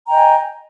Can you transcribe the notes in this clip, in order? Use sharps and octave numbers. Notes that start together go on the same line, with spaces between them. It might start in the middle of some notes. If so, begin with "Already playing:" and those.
D#5 G5 G#5 A#5